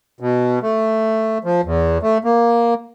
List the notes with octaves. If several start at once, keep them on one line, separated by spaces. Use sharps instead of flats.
B2
A3
F3
E2
A3
A#3